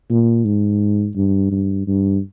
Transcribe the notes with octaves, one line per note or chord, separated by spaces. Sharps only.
A#2
G#2
G2
G2
G2